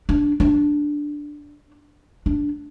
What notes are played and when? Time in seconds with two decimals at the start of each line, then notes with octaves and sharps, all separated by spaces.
0.09 D4
0.40 D4
2.26 D4